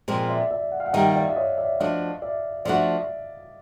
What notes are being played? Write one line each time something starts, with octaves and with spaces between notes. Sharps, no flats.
A#2 F3 G#3 C4
D5 E5
D5 E5
F#5
F5
E5 F#5
D#3 G3 A#3 D#5 F5
F5
D5 E5
E5
C#5 D#5
D5 E5
F3 A3 D4 F#4 D#5 F5
D5 E5
F3 A3 D4 F#4 D5 E5